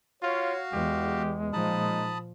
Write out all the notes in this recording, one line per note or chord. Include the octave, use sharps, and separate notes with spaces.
F4 F#4 C#5 F5
E2 G#3 G4
A#2 F3 D#4 A5 B5 D#6